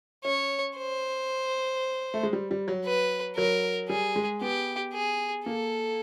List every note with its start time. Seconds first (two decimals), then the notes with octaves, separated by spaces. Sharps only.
0.25 C#4 C#5
0.77 C5
2.14 A3
2.23 G#3
2.33 G3
2.51 G3
2.68 F#3
2.85 B4
3.37 F#3 A#4
3.89 G3 G#4
4.16 G#3
4.41 B3 G4
4.93 G#4
5.45 A#3 A4